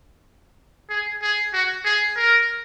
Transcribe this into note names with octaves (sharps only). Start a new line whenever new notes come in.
G#4
G#4
F#4
G#4
A#4